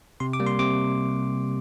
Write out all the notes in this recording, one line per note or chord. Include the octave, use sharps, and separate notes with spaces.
C3 C6
D6
G3 A#3
C6
C3 D6